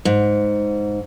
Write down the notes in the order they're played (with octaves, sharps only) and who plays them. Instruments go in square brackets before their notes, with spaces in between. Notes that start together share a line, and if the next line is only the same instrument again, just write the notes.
[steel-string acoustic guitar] G#2